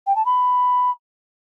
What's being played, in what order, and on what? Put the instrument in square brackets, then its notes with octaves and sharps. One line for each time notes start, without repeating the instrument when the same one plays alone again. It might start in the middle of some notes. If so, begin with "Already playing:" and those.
[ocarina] G5
A5
B5